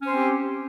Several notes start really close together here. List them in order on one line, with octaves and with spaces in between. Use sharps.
C#4 C5 C4 G4